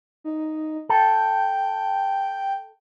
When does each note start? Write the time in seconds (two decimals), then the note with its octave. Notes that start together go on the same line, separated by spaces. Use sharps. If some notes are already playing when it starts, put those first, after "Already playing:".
0.24 D#4
0.89 A4 G5